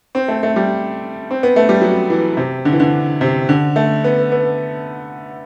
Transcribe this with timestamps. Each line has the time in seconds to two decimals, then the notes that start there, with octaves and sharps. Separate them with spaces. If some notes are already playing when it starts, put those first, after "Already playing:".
0.15 C4
0.28 A3
0.43 A3
0.56 G3
1.31 C4
1.43 B3
1.56 A3
1.69 G3
1.81 F#3
2.10 E3
2.37 C3
2.65 D3
2.72 E3
2.80 D3
3.21 C3
3.49 D3
3.76 A3
4.04 B3
4.32 B3